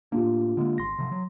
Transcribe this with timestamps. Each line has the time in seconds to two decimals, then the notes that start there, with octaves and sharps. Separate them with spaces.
0.12 A2 A#3 D4 F4 G4
0.57 D3 G#3 A#3
0.78 G#1 C6 A#6
0.98 C3 F3
1.11 F#3